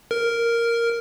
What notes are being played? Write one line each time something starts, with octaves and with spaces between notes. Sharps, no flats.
A#4